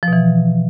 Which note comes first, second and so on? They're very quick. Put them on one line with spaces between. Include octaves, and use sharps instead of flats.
F3 B2 E3